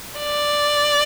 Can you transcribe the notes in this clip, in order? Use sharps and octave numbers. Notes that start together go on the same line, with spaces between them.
D5